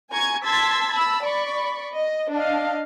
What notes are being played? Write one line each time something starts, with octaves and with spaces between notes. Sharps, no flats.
G#5 A#5 C#6 G#6
A5 C6 E6 G#6 A6 B6
A5 B5 E6
D5 B5 C#6
D#5
D4 D#5 F5